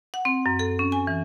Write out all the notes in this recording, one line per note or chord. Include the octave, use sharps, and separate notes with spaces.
F#5
C4
F#2
A4
C#4
G#5
E3